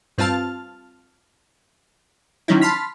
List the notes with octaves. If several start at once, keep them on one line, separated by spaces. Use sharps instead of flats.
G2 C4 F4 F5 A5 F6
D#3 F3 F#3 C#4 D#4 E4
A5 B5 C6 F6 B6